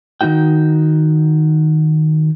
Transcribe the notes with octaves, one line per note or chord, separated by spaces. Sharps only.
D#3 G#3 D#4 F#4 G5